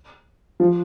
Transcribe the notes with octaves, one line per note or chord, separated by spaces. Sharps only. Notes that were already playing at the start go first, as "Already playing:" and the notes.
F3